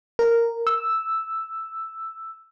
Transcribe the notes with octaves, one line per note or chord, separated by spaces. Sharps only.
A#4
E6